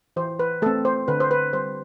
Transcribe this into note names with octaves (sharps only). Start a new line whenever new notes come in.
E3 C5
B4
A3 C4 A4
C5
D3 B4
C5
B4
G3 C4 C5